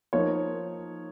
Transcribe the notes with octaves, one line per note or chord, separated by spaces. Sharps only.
F3 A#3 D#4 C#5